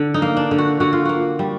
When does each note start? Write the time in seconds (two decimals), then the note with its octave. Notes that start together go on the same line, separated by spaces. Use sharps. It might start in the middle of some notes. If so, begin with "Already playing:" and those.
Already playing: D3
0.14 D#4
0.22 A#3
0.37 D4
0.51 D3
0.58 F#4
0.80 D3 F#4
0.93 F4
1.05 A#3 F#4
1.39 G3